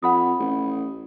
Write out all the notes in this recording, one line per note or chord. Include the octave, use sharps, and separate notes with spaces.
F2 F#5 B5 D#6
A1